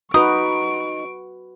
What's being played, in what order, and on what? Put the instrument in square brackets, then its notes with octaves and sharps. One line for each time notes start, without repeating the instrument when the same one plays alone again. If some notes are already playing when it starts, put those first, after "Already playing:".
[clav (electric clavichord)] D#4 [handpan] F#4 B4 [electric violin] C#6 D7 [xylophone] D#6